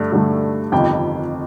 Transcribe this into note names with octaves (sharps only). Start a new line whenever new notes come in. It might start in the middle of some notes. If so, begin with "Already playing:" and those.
Already playing: G2 D3 A3
G2 D3 A3
G1 F2 C3 D#3 G5